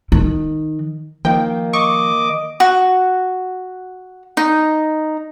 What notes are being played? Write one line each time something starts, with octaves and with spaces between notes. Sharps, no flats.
D#3
D#3 F3 A#3 G5
D#5 C#6 D6
F#4
D#4